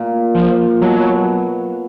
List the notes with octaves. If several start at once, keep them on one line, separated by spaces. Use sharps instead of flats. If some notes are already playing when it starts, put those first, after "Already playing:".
Already playing: A#2
F3
B2 F#3